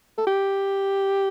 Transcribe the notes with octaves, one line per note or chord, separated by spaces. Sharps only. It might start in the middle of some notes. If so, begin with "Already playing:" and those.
A4
G4